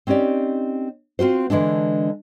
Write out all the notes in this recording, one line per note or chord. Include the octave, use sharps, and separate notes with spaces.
C4 C#4 D#4 G4 D5
C4 F4 F#4 C5
D3 E3 G#3 A3 D4